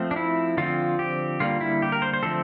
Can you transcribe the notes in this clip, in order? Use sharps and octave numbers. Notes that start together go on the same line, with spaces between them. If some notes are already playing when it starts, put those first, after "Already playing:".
Already playing: F3 A3 C4
D4
E4
D3 F3 C4 F4
G4
D3 G3 A#3 F4
E4
G4
A#4
C5
C5
D3 F3 A3 C4 A4